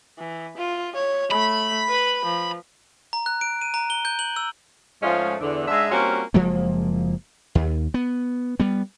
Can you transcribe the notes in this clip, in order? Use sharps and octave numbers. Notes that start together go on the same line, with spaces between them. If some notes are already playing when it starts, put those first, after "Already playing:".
E3
F4
C#5
A3 B5
B4
F3
A#5
F#6
D7
D#7
A#5
G7
G6
F#7
E6
G#2 F3 G#3 A3 C#4 F4
E2 D3
G#2 G#3 D4 E5
G3 A#3 C4 C#4 F4 F#4
F#1 F3 G#3 A#3
D#2
B3
G3 B3